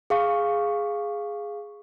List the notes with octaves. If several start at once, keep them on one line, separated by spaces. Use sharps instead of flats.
G#4 F5 C#6